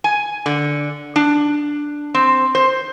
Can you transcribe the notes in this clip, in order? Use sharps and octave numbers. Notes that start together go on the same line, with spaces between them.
G#5
D3
D4
C4
C5